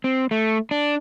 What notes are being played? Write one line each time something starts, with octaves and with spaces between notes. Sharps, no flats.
C4
A3
D4